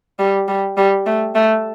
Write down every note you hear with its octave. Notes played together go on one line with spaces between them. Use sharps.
G3
G3
G3
A3
A3